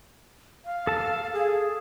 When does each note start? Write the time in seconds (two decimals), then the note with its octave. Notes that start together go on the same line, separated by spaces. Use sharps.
0.65 F5
0.87 A4 A5
1.33 G#4